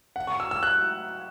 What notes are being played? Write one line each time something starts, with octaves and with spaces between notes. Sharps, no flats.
F#5
C#6
E6
E6
F#6